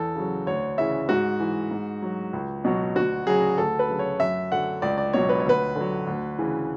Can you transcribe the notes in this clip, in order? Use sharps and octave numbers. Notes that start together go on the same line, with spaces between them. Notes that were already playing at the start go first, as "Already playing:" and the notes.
Already playing: E2 A4
C#3 F#3
D2 C#5
C#3 E3 E5
G#2 F#4
E3
G#2
F#3
C#2
B2 F#3
D2 F#4
C#3 F#3 G#4
D2 A4
B4
C#3 F#3
C#5
F#2 E5
D3 F#3 F#5
C#2 D5
D5
B2 F#3 C#5
B4
C#5
D2 B4
D3 F#3
D2
C#3 E3